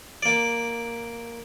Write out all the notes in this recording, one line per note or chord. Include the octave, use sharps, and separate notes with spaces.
A#3 D5